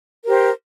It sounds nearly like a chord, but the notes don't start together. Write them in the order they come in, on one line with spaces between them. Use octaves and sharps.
A#4 G4 C5